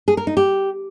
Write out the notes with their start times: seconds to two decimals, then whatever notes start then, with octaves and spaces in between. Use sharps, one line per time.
0.08 G#4
0.17 A#4
0.27 D#4
0.37 G4